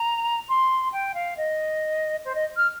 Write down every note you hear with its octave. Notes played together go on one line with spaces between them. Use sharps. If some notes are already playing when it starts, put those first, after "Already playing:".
Already playing: A#5
C6
G5
F5
D#5
C5
D#5
F6